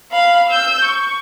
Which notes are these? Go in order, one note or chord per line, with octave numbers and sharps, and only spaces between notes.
F5 B5
E6 G6
C#6